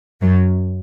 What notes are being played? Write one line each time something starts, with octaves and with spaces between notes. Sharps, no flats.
F#2 F#3